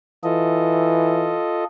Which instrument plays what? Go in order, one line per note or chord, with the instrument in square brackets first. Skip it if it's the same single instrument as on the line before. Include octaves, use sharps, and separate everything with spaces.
[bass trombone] E3 [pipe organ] F4 A4 D#5